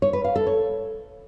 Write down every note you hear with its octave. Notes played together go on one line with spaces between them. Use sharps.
C#5
B4
F5
A4
C#5